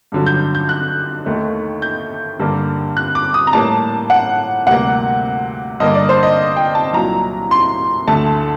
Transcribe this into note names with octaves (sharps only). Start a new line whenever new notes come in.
G2 D3 F#3
G6
G6
F#6
D#2 D#3 A3
G6
G2 D3 G3 A#3
F#6
D6
D#6
A#5
A2 G3 A#3 A5
F#5
D2 C3 G3 A#3 F#5
G2 D3 G3 A#3 D#5
D5
C5
D#5
G5
A5
C2 A#2 F#3 A#5
C6
D2 D3 A3 A5